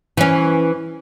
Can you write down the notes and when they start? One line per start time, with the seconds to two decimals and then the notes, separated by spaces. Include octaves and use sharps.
0.17 E3 C#4